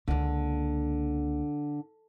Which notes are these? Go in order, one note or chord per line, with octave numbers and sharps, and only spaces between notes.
C#2 D3 A#3